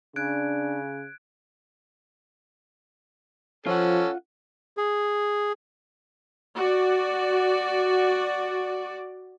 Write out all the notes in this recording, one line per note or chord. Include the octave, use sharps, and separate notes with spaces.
C#3 D4 F#6 G#6 D7
F3 C#4 F4 A4 F#5
G#4
F#4 D5